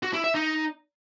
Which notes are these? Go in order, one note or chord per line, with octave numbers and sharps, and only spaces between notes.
F#4
E4
E5
D#4